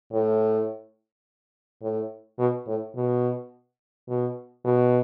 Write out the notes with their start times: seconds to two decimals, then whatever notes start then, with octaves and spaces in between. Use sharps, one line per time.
0.12 A2
1.82 A2
2.39 B2
2.67 A2
2.95 B2
4.08 B2
4.65 B2